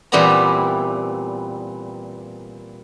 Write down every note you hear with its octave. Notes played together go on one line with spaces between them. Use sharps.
A#2 E3 G3 B3 C4 A#5